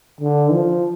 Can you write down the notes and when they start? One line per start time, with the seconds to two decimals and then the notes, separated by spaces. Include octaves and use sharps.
0.21 D3
0.53 F3